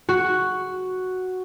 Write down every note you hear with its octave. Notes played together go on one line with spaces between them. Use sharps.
F#4